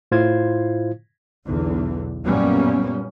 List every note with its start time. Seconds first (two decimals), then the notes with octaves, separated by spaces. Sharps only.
0.12 A2 E4 F4 C5 F5 G#6
1.46 B1 E2 D3
2.26 F#2 A#2 G3 A#3 B3 C#4